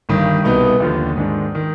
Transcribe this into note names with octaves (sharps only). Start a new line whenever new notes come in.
G1 G2 D#3
C2 B2 B3 D#4
D#2 D3 F3
G#2 D#3 G#3 D4
D#3